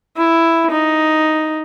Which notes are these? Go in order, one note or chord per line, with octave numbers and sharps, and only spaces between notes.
E4
D#4